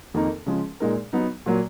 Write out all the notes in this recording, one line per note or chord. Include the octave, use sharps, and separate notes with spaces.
F2 D#3 A#3 D#4 A#4
C#3 F3 G#3
A#2 G#3 D#4 A#4
F#3 B3 D#4
A#2 F#3 A#3